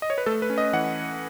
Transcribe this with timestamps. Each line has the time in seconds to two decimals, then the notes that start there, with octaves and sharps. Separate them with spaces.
0.02 D#5
0.10 C#5
0.18 B4
0.26 A3 A4
0.42 B4
0.50 C#4
0.58 D#5
0.73 E3 F#5